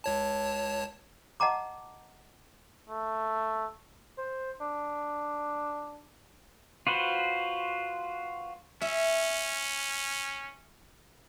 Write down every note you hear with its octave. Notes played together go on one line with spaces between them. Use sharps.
C#2 C#5 A5
D#5 F#5 A5 A#5 D6
A3
C5
D4
F4 F#4 B4 C5
C#4 E5